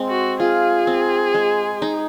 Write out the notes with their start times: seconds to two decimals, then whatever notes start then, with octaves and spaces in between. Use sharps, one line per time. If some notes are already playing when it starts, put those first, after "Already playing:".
Already playing: G#3 C4
0.08 F#4
0.40 F4 G#4
0.87 C4
1.34 G#3
1.82 D#4